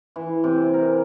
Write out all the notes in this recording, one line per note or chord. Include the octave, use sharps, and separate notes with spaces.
E3
C3
A#4